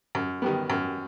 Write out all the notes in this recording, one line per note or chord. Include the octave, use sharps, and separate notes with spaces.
F#2
D#3 G3 B3
F#2